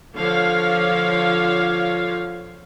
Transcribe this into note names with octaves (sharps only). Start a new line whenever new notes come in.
D3 F3 C#5 F5